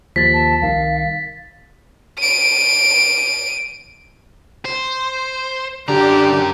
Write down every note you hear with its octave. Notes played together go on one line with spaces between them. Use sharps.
D#2 F3 A6 B6
A5
C2 D#3 F5
D7 D#7
C5
F#2 D3 G4 A#5